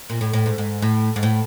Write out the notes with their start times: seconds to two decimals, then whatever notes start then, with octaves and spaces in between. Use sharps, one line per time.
0.10 A#2
0.21 A2
0.33 A2
0.46 G#2
0.58 G#2
0.82 A2
1.16 G#2
1.23 A2